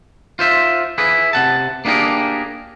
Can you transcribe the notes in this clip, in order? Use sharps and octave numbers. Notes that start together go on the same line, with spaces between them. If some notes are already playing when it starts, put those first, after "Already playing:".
F4 C5 E5
E4 G#4 B4
C3 F#5 A5
A#3 B3 D4 G4 G#4 A#4